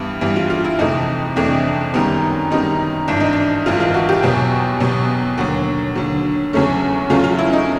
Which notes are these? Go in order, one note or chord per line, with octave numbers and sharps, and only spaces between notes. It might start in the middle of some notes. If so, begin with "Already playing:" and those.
Already playing: G2 E3 G3 B3
G2 E3 G3 B3
F4
F4
E4
F2 C3 E3 A3 D#4
F2 C3 E3 A3 D4
F#2 D#3 G3 B3
F#2 D#3 G3 B3 D#4
G#1 G2 E3 D4
D#4
D4
G#1 G2 E3 F4
F4
F#4
G4
E2 B2 F#3 B3
E2 B2 F#3 B3
D#2 D3 F#3 F#4
D#2 D3 F#3
E2 C#3 F#3 A3 C#4
E2 C#3 F#3 A3 C#4 F4
F4
E4
D#4